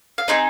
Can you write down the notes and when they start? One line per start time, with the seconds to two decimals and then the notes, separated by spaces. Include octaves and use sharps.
0.18 F5
0.28 C4 D#4 G#4 D#5